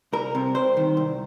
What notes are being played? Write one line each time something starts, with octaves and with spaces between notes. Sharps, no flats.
C2 A#4
C3
C2 C5
D#3
C2